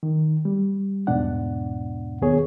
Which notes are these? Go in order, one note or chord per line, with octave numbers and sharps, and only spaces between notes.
D#3
G3
E2 G#2 B2 D4 F#5
D#2 B3 G#4 C#5